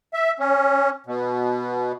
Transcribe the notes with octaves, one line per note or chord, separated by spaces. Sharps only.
E5
C#4
B2